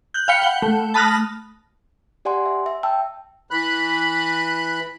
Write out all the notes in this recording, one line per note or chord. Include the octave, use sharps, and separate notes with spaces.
F#6 G6
F5 G5 B5 C#7
F#5 G7
A3
A5 B5 D#6 F6 F#6 A#6
G4 D5 F#5 G#5 C6
E5
E5
G5 A5 E6
E3 B5 F#6